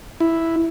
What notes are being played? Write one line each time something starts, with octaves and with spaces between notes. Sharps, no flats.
E4